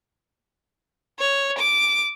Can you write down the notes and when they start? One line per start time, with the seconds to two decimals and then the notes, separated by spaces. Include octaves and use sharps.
1.19 C#5
1.59 D6